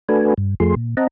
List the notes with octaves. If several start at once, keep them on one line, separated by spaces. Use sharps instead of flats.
A3 D4 F#4 A4 B4 G#5
G2
F2 F3 A3 G#4 C6
A#2
C4 D#5 F#5 A5 A#5